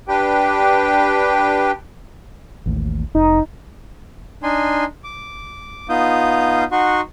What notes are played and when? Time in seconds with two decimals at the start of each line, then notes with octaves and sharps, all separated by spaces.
0.08 D4 G4 B4 G5
2.66 A1 D#2 A2
3.15 F1 D#4
4.43 D4 D#4 G#5 C6
5.04 D6
5.89 B3 D#4 F4 F5 D#6 G6
6.72 D#4 F#4 F#5 C6 C#6